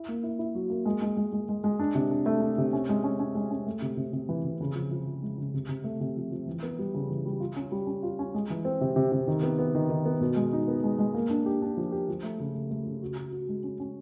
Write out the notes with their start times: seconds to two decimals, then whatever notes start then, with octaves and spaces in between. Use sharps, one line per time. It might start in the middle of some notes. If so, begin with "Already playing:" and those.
Already playing: E4
0.09 A#3
0.23 E4
0.39 E4
0.55 F#3
0.70 A#3
0.86 G#3
1.02 G#3
1.17 G#3
1.33 G#3
1.49 G#3
1.64 G#3
1.79 D4
1.95 C3
2.11 D4
2.26 A3
2.41 D4
2.58 C3
2.73 C#4
2.89 G#3
3.04 C#4
3.20 C#4
3.35 G#3
3.51 C#4
3.67 A3
3.82 C3
3.97 C3
4.13 C3
4.29 E3
4.44 C3
4.61 C#3
4.75 F3
4.91 F3
5.06 F3
5.22 G#3
5.38 C#3
5.54 C3
5.69 C3
5.84 A3
6.00 C3
6.16 F3
6.31 F3
6.47 E3
6.63 B3
6.79 G3
6.94 C#3
7.10 E3
7.25 G3
7.40 F4
7.56 C#4
7.72 G3
7.87 C#4
8.03 F4
8.19 C#4
8.34 G#3
8.50 E3
8.65 C4
8.81 C3
8.96 C3
9.12 C3
9.27 D#3
9.43 B3
9.59 B3
9.75 D#3
9.90 D#3
10.06 B3
10.21 B2
10.36 G#3
10.53 D#4
10.68 B3
10.84 G#3
10.99 G#3
11.14 A#3
11.30 D4
11.46 G4
11.62 D4
11.77 F3
11.92 G4
12.08 F3
12.23 A3
12.39 C#3
12.54 A3
12.71 A3
12.86 C#3
13.02 F#4
13.17 F#4
13.32 F#4
13.48 G#3
13.64 C#4
13.80 C#4